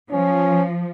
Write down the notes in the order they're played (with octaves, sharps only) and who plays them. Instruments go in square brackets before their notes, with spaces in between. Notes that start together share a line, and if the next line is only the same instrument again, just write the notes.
[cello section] F3 [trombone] C#4